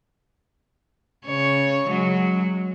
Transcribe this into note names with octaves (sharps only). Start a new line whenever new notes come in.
C#3 C#5
F#3 G#3